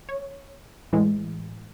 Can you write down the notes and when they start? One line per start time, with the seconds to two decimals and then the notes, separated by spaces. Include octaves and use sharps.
0.09 C#5
0.93 A2 E3 G#3